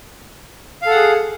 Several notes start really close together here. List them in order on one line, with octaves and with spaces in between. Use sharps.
F5 A4 F#5 G#4